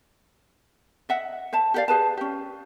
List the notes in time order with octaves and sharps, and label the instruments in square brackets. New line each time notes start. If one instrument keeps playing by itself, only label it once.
[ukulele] D#5 E5 F#5
C5 E5 A5
G4 A4 D5 F5
G4 G#4 B4 A5
C#4 G4